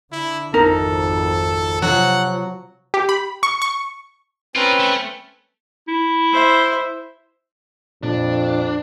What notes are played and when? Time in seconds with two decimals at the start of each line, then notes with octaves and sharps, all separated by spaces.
0.12 D3 E4
0.54 G#1 F2 D#4 E4 A4 A#4
1.82 C3 F3 F#3 F#5
2.94 G4
3.09 B5
3.43 C#6
3.62 C#6
4.56 C4 C#4 F4 A#4 B4
4.80 A3
5.88 E4
6.33 C5 E5
8.03 F2 A#2 D4